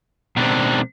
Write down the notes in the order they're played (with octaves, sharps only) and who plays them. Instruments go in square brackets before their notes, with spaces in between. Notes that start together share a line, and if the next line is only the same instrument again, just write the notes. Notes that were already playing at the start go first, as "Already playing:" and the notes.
[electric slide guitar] B2 G#3 C4 [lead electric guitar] D#3 D4